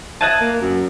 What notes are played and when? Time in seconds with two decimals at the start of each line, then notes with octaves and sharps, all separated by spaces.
0.21 D#5 E5 A5 F#6 G#6 D#7
0.41 A#3
0.61 F#2